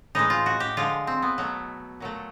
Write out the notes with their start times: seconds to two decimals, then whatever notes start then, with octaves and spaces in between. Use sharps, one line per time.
0.15 A2 E3 G#3 D#4
0.30 F4
0.46 F#4
0.60 G4
0.77 D3 F3 G#3 F4
1.07 C4
1.22 B3
1.38 B2 F#3 A3
2.00 A#2 F#3 A3